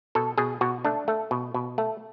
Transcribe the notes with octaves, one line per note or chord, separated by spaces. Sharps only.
B2 A4
B2 G#4
B2 F#4
A3 D4
A3
B2
B2
A3